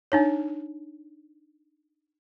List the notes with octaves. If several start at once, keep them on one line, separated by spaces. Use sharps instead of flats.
D4 D#4 C#5